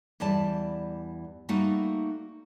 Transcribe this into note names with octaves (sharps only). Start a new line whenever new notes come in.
E2 E3 G3 D5 A5
G3 A3 A#3 D#4 F#4